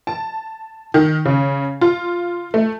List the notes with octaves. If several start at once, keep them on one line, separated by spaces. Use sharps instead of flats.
A5
D#3
C#3
F4
A3